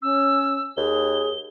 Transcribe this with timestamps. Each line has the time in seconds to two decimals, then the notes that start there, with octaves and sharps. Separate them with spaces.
0.02 C#4 E6
0.77 D#2 G#4 G7